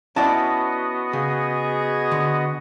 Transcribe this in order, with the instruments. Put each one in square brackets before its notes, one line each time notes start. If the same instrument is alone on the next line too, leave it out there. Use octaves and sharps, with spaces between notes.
[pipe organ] B3 F#4 D#5 [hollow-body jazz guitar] C#4 E4 D5 [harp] A5
[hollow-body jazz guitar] C#3 [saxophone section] G#4
[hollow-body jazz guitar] D3